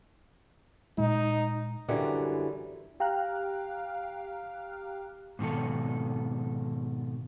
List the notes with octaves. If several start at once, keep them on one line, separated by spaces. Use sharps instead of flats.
A#2 G#3 D#4
F#2 D3 E3 G3
G4 F5 G5 A#5 F6 F#6
G#2 B2 D#3 A4